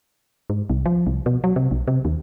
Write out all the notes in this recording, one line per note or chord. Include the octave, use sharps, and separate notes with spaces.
G#2
C2
F3
C2
B2
F#3
C3
B1
C3
D#2